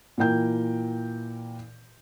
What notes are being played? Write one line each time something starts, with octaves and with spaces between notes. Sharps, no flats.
A#2 E3 A#4 G5 G6